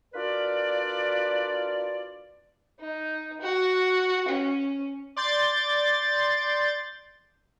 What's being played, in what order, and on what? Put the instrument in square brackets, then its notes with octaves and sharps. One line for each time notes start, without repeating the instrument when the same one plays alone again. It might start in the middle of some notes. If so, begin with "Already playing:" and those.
[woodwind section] D4 F4 F#4 A#4 B4 D5
[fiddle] D#4
F#4
C#4
[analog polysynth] D5 C6 G6 A6